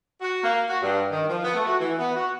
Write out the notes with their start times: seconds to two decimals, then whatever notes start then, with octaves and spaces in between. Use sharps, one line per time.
0.21 F#4
0.43 A#3
0.69 F#4
0.82 G2
1.11 D#3
1.28 F3
1.44 B3
1.55 A3
1.66 F#4
1.80 E3
1.98 B3
2.16 F#4